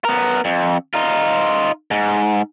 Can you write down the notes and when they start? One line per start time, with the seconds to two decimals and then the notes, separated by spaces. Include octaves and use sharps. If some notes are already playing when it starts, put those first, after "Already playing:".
0.05 B3 A#4
0.45 F2
0.94 D#4 F4
1.91 G#2